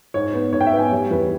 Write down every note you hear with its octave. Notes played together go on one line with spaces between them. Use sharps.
G#2 C#5
B3
G#2 C#5
G5
E5
B3
G#5
G3 C#5
E2 B4